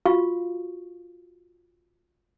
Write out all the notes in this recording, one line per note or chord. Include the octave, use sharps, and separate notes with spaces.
F4 F#4 F5 C#6